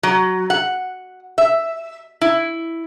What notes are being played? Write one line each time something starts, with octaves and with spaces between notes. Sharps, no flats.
F#3
F#5
E5
E4